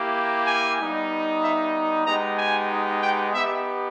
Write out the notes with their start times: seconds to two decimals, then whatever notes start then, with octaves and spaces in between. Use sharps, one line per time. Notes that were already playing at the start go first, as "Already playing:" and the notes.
Already playing: A#3 E4 G4
0.47 G#5
0.79 G3 B3 D#4
1.43 E5
2.07 G#3 B3 D#4 G4 A#5
2.38 G#5
3.02 G5
3.34 B3 D#4 G4 E5